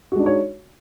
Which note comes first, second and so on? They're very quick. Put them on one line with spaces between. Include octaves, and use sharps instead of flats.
F#4 G#3 D4 D#4 C#5